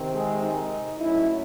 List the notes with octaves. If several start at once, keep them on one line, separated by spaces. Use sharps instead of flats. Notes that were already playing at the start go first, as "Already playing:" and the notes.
Already playing: C3 D#3 C4
G#3 G#4
D#4
A2 F#3 A3 C#4 E4